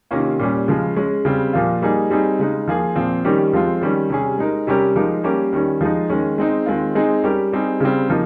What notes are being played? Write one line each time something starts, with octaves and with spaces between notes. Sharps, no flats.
C3 D#3 A#3 C#4 F4
A#2 G3 C#4
C#3 F3 G#3
G#3 C#4 G#4
C#3 G3 C4
A#2 F3 A#3 F4
G3 A#3 D#4 G#4
G3 C4 D#4 G#4
C#3 G#3 D#4
F3 A#3 F4 G#4
A#2 F3 C4
D#3 G3 C#4 G4
F3 G#3 C4 F4
D#3 G3 C#4
C3 G3 C#4 G#4
G#3 D#4 A#4
C3 G3 C#4 G4 A#4
F3 G#3 D#4 G4 A#4
G3 A#3 C#4 G4 A#4
D#3 G3 C#4
F3 G#3 D#4
D#3 G#3 C#4
G#3 C4 D#4
D#3 G#3 C4 F4
G#3 C4 D#4 G#4
G3 C#4 G4 A#4
G3 C4 D#4 G#4
C#3 G3 C4
C#3 F3 A#3 D#4